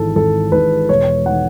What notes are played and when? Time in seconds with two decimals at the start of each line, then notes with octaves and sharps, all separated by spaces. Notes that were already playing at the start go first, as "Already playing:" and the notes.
Already playing: G#1 G#2 E3 A4
0.16 G#1 A4
0.52 G#2 E3 B4
0.89 E1 C#5
1.26 D#3 F#5